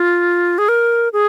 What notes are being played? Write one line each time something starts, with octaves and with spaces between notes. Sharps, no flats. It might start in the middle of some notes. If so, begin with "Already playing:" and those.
Already playing: F4
G#4
A#4
G#4